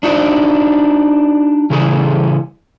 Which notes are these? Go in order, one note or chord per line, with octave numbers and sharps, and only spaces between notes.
D4 D#4 F#4 D5
C#3 E3 G3 G#4